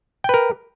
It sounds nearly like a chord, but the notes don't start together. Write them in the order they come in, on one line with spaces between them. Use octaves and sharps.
G5 B4 A#4